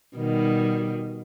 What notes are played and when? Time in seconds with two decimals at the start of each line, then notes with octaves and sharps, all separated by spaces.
0.15 B2 D#3 G3